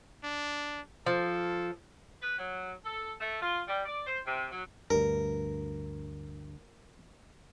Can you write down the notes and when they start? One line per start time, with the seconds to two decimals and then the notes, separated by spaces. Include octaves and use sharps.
0.24 D4
1.06 F3 A4
2.21 B4
2.37 F#3
2.84 A4
3.18 A3
3.41 F4
3.68 G3
3.85 D5
4.05 C5
4.25 C3
4.51 F#3
4.90 D2 G2 A#4